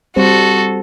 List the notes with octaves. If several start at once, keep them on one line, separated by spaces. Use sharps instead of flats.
G3 C4 F#4 A4 C5